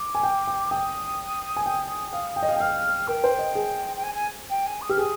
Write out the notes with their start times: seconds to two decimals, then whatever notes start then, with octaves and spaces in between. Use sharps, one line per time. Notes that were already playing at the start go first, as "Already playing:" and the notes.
Already playing: D6
0.15 G#5
0.23 G5
0.47 G5
0.71 G5 D#6
1.57 G#5
1.66 G5
2.13 F5
2.36 G5
2.43 D#5
2.49 F5
2.56 G5
2.60 F5 F6
3.07 A#4 G5
3.24 C5
3.39 D#5
3.55 G#4
3.96 G5
4.03 G#5
4.14 G#5
4.49 G5
4.66 G#5
4.81 D#6
4.89 G4 F6
4.97 G#4 D#6